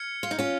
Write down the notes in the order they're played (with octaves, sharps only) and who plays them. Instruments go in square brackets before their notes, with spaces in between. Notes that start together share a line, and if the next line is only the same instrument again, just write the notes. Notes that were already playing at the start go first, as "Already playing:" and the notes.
Already playing: [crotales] F6 G#6 C#7
[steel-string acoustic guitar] F4
D#4
C#4 F4